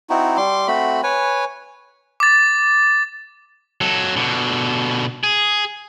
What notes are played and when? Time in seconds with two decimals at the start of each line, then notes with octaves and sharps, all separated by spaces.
0.10 C4 D#4 E4 F#4
0.37 G3 C6 D6
0.68 A3 C4 F#4 B5
1.03 B4 C#5 G#5
2.20 D6 A6
3.81 F#3 A4
4.16 B2 D3
5.23 G#4